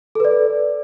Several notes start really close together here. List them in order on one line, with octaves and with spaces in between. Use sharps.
A4 B4 D5